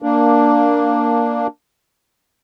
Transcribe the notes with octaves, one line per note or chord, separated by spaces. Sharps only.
A#3 D4